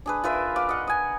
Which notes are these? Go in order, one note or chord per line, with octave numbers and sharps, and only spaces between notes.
D4 G#4 B4
F4 A#4 B4 E5
F4 D5
D#5 F#5
D#5 G#5